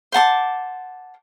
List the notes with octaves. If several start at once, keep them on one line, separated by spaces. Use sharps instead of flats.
C5 F#5 A5 D6